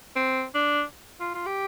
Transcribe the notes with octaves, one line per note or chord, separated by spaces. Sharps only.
C4
D4
F4
F4
G4